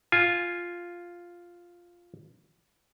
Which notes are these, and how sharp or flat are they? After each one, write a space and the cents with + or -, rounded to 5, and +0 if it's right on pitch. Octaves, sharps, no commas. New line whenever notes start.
F4 +0 G#5 +0